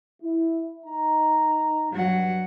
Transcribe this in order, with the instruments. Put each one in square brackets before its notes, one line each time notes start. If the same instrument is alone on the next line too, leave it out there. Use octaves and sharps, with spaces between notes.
[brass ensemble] E4
D#4 A#5
[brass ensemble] G2 [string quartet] F#3 F#5